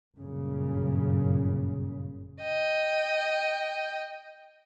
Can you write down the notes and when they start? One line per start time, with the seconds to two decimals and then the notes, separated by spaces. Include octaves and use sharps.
0.18 G1 F#2 A#2 C#3
2.41 D#5 G5